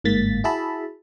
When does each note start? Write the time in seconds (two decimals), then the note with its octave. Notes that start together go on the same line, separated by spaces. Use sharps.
0.04 G1 G#2 A#3 A6 B6
0.44 E4 F#4 G#4 E5 A5 B5